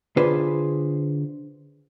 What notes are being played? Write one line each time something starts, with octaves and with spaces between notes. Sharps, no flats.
D3 D4 F4 G#4 B4 C5